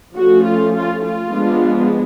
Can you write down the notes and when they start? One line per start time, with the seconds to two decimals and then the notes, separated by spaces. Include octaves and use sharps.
0.16 F3 A3 C#4 F#4
0.45 F4
0.75 F4
1.03 F4
1.32 F3 G#3 B3 D4